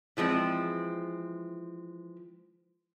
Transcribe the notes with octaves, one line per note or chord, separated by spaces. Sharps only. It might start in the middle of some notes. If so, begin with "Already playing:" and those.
E3 F3 G#3 C4